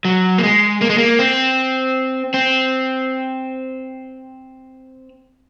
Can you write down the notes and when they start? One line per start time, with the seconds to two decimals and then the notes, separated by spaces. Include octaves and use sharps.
0.05 F#3
0.38 A#3
0.43 G#3
0.81 A#3
0.90 G#3
0.98 A#3
1.19 C4
2.34 C4